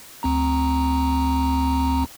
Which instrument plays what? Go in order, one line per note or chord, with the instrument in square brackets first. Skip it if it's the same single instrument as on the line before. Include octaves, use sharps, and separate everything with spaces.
[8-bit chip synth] D2 C4 A#5